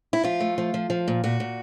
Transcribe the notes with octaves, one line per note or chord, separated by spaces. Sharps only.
E4
F3 F4
A3
F3
F3
F3
A#2
A#2 F#4
A#2